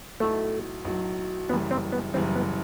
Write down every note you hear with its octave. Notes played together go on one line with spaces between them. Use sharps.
B1 A2 F#3 A3
B1 A2 F#3
F#1 F#2 E3 G3 B3
C4
B3
F#1 F#2 E3 G3 C4
B3